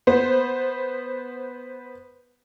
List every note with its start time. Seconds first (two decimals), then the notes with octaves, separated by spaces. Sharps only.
0.07 B3 C5